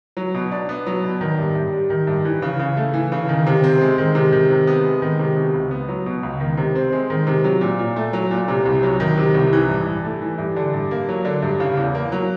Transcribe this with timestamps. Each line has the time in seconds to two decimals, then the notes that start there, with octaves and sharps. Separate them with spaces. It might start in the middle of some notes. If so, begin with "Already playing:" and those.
0.17 F#3
0.34 B2
0.51 D4
0.69 B3
0.86 F#3
1.04 B2
1.21 D#3
1.38 G2
1.55 G2
1.73 G3
1.90 D#3
2.07 G2
2.25 E3
2.42 C#3
2.59 C#3
2.77 A3
2.94 E3
3.12 C#3
3.29 D#3
3.47 C3
3.64 C4
3.81 G#3
3.98 D#3
4.15 C3
4.32 D#3
4.50 C3
4.67 B3
4.85 G#3
5.02 D#3
5.19 C3
5.36 B2
5.54 C#2
5.71 B3
5.88 F#3
6.06 B2
6.23 C#2
6.40 D#3
6.57 C3
6.75 C4
6.93 G#3
7.10 D#3
7.27 C3
7.44 F#3
7.61 A#2
7.79 A#2
7.96 A3
8.13 F#3
8.31 A#2
8.48 C3
8.66 C2
8.83 F#3
9.00 D#3
9.18 C3
9.34 C2
9.53 E3
9.69 G2
9.86 G2
10.04 A3
10.21 E3
10.38 G2
10.56 D3
10.74 G2
10.91 A#3
11.09 F#3
11.25 D3
11.42 G2
11.60 C#3
11.77 E2
11.95 A#3
12.12 F#3